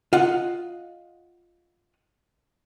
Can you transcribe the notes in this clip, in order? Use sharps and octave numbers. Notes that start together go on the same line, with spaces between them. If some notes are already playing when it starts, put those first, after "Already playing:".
F4 D#5 F#5